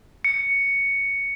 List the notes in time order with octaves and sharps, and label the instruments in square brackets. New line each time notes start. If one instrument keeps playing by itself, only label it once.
[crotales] C#7